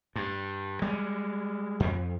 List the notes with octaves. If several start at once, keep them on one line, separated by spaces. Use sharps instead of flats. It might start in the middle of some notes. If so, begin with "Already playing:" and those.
G2
G3 G#3
F2